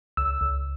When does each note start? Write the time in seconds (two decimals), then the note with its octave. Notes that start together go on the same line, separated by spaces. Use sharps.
0.17 C#2 E6
0.41 C#2